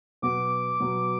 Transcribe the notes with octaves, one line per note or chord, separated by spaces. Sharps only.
B2 F#3 B3 F#4 D6
B2 F#3 B3 F#4